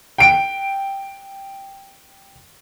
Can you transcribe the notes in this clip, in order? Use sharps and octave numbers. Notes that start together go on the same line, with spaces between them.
G5 D7